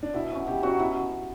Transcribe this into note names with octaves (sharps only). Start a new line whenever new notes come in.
D4
B2 E4
F#3 C#4
B2 G4
F#3 C#4 F#4
B2 E4